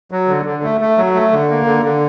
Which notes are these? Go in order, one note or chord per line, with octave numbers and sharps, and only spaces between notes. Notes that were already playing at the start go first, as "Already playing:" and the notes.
F#3
D3
D3
A3
A3
F#3
A3
D3
A#3
D3
D3